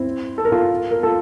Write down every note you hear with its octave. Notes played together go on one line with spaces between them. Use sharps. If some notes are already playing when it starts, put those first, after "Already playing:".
Already playing: C4 E4
A4
A#4
F4 A4
A#4
F4 A4